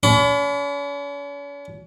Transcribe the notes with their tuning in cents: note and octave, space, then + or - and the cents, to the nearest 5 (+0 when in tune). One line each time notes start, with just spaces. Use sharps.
C#4 +45 B5 +30